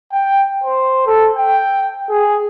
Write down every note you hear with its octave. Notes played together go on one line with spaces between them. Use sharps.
G5
C5
A4
G5
G#4